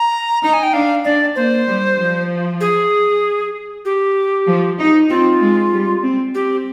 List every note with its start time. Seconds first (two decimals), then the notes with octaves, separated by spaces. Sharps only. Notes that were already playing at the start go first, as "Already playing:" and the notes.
Already playing: A#5
0.43 D#4 A#5
0.54 G#5
0.63 G5
0.73 D4 F5
1.05 D4 D5
1.36 A#3 C5
1.67 G3
1.98 F3
2.61 G#4
3.85 G4
4.47 F3
4.79 D#4
5.10 C4 F4
5.41 G#3
5.72 G3
6.03 C4
6.35 C4 G4